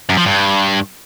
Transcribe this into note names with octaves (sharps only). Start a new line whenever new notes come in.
F#2
F3
G2